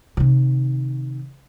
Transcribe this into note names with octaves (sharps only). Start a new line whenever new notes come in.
C3 D#3